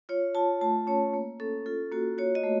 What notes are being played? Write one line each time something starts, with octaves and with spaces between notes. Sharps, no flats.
F4 C#5
F4 A5
A3 A5
C#4 C#5
A#3
C#4 A4
F4 A4
A#3 F#4
F#4 C#5
D#5
A3